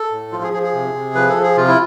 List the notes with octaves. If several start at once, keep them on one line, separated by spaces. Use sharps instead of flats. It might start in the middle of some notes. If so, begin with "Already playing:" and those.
Already playing: A4
A2
F3 F4
G#4
F3 G#4
G#4
C3
C3
F3 B4
A4
F3
G#4
C3 F4
E4